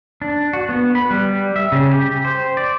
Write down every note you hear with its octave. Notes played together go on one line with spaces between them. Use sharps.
D4
F#4
B3
B4
G3
E5
C#3
G4
C5
D5